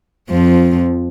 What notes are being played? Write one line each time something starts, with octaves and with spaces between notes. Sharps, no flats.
F2 F3